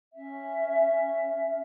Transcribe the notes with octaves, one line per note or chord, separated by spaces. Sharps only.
C#4 E5